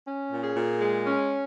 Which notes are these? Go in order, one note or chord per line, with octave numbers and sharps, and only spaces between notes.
C#4
A#2
G#4
A#2
G#3
C#4